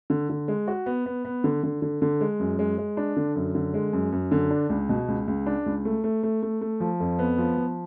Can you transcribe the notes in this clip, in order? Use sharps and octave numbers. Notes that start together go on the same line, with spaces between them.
D3
D3
G#3
F#4
B3
B3
B3
D3
D3
D3
D3
G#3
F#2
G#3
G#3
D4
D3
F#2
D3
G#3
F#2
F#2
D3
D4
C#2
B2
C#2
C#2
D4
C#2
A3
A3
A3
A3
A3
F3
F2
B3
F3
F3